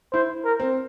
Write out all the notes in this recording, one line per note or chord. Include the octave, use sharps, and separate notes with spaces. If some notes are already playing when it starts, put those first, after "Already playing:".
E4 C5
A#4
C4